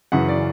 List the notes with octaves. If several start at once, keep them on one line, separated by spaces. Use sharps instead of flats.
F#2 C#3 E3 F#5
D5